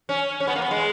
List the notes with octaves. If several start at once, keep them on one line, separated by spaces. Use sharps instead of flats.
C#4
C#4
B3
A#3
B3
G#3